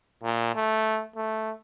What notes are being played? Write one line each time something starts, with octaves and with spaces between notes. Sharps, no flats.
A#2
A3
A3